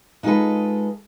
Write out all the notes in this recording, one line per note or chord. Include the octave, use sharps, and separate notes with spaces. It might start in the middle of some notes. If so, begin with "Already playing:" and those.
G#3 D#4 F4 G#4 A4 B4